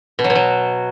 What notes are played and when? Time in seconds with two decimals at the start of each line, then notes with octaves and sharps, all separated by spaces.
0.19 B2
0.24 F#3
0.30 B2
0.35 F#3